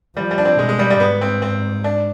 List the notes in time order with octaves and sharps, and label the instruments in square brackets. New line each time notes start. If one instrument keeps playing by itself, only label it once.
[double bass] F3 [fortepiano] G3
[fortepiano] G3
D4
C4
[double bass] B2 [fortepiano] G#3
[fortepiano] G#3
G3
G3
[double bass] G#2 [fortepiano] B3
[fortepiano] C4
C4
D4